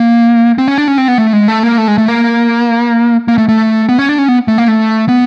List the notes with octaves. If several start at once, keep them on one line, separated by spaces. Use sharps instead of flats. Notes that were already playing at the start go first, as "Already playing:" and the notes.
Already playing: A#3
C4
C#4
D4
C#4
C4
B3
A3
G#3
A3
A#3
A3
G#3
A3
A#3
A#3
A3
A3
B3
C#4
D4
C#4
B3
A3
A#3
A3
B3